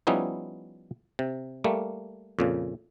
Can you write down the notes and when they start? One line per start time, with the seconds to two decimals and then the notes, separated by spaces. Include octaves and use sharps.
0.07 F3 G3 B3 C#4 D#4 E4
1.19 C3
1.64 G3 A3 A#3
2.39 F2 A#2 C#3